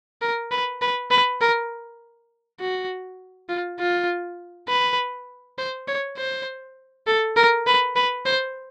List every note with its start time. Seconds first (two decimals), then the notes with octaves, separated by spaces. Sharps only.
0.22 A#4
0.51 B4
0.82 B4
1.11 B4
1.41 A#4
2.60 F#4
3.49 F4
3.79 F4
4.68 B4
5.58 C5
5.88 C#5
6.17 C5
7.07 A4
7.36 A#4
7.67 B4
7.96 B4
8.26 C5